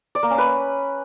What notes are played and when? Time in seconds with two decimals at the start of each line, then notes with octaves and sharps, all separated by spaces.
0.15 D5
0.23 A#3
0.30 C#4
0.38 B4